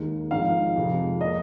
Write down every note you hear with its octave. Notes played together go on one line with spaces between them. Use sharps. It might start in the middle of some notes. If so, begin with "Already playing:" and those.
Already playing: D#2 D#3 G#3 D#4
G#1 G#2 F3 G#3 D#4 F5
F2 C3 F3 G#3
F3 A#3 D#5